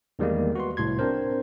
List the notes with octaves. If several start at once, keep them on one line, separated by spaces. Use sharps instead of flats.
E2 D#3 G3 G#3 A#3
F#4 B4 C6
C2 A2 C6 G#6
C4 D4 A#4 C5